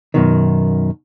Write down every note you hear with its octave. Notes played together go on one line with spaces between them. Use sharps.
F#2 B2 D#3